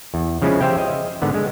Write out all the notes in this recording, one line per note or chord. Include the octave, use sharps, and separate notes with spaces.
E2
C#3 F3 G#3 C#4 E4
G4 C5 E5 F5 G5
D#5
G#2 D3 B3
G#3